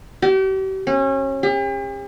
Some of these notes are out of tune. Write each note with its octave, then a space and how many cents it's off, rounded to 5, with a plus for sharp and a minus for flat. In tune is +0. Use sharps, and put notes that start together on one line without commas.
G4 -40
C#4 -30
G4 +45